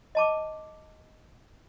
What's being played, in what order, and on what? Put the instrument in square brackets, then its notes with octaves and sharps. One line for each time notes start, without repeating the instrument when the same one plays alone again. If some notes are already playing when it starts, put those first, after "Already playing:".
[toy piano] D#5 A5 D6